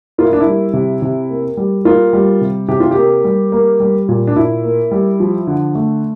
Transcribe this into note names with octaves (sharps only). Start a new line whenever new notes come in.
A#3 F4
E4
D4
E4
G3
C3
C3
A#3
G3
A#3 F4
G3
C3
C3 G4
F4
A#3 G4
G3
A#3
G3
A#2
D4
A#2 E4
A#3
G3
F3
D3
A3